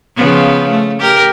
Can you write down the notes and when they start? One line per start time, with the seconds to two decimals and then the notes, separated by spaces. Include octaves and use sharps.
0.15 C#3 F3 B3
0.70 A3
0.99 G4 A#4